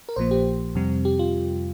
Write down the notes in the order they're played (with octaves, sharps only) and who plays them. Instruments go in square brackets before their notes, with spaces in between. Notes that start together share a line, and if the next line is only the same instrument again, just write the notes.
[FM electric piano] A#4
A#1 A#2 F3 A#3 C5
G4
F2 C3 G3 C4
G4
F4